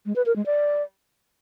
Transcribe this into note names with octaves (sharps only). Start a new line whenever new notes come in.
G#3
B4
A#4
G#3
D5